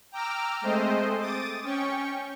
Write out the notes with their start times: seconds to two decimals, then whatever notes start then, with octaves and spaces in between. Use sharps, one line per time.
0.12 G5 A#5 D6 E6 F6
0.61 G#3 A3 C4 C5 D#5
1.20 D6 D#6 A6
1.63 C#4 G5 C#6